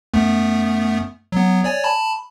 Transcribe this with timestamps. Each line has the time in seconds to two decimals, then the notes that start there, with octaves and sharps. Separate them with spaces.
0.14 F#2 A3 B3
1.32 F#3 B3
1.64 C#5 D5 G#5
1.84 A5 B5